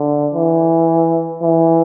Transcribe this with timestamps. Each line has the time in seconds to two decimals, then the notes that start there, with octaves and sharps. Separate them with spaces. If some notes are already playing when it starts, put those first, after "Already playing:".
Already playing: D3
0.34 E3
1.42 E3